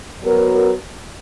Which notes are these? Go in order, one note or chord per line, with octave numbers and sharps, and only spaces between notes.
F#3 B3 F#4 A#4